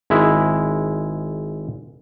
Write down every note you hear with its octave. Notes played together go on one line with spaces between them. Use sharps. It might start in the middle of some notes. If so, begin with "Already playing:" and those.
G#1 G#3 E4